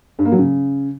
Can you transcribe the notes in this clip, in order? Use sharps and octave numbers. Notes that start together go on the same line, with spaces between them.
G2
A#3
F#3
C#3